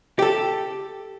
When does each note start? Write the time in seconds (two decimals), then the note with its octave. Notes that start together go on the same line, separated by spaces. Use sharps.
0.19 G4 A4